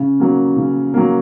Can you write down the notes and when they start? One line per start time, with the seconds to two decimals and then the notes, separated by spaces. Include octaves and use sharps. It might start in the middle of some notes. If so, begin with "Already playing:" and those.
Already playing: C#3
0.20 F#3 A#3
0.57 C#3
0.94 F#3 A#3